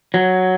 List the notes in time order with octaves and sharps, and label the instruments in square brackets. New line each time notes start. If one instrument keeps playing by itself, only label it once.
[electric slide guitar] F#3